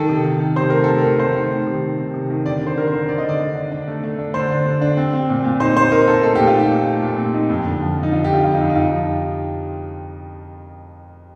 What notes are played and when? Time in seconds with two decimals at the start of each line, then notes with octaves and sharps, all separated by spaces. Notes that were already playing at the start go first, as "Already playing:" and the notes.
Already playing: D#3 A4
0.09 C3
0.24 D#3
0.40 D#3
0.56 C3 C5
0.70 A3 A#4
0.84 C3 A4
0.98 A#4
1.04 D#3
1.19 A3 C5
1.35 D#3
1.51 D#3
1.67 C3
1.82 D#3
1.98 C3
2.14 C3
2.30 D#3
2.46 D3 D5
2.61 D3
2.67 C5
2.77 D4 A#4
2.87 C5
2.93 D3
3.08 D3 D5
3.18 D#5
3.24 D3 D5
3.40 D3
3.55 D4
3.71 D4
3.87 A3
4.03 A3
4.19 D4
4.34 D3 C5
4.50 D4
4.66 D3
4.81 D4
4.97 C4
5.13 C4
5.29 A#2
5.44 A#2
5.60 D#4 C5
5.76 D#4 C5
5.92 D#4 A#4
6.08 D#4 A4
6.23 A3 A4
6.35 A#2 G4
6.47 F4
6.55 D#4 G4
6.71 A#2
6.87 A3
7.02 A#2
7.18 C4
7.34 D#4
7.49 F2
7.66 D3
7.81 F3
7.97 F3
8.03 D#4
8.12 D3 F4
8.24 D3 G4
8.34 F4
8.44 F2 F4
8.54 D#4
8.60 F2
8.70 D#4
8.75 F2 F4
8.92 F3